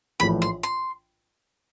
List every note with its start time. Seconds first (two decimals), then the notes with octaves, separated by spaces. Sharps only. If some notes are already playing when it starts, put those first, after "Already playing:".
0.20 A#1 A2 E3 B5
0.42 C6
0.63 C6